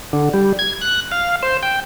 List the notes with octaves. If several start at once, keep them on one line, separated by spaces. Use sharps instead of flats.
D3
G3
G#6
F#6
F5
C5
G5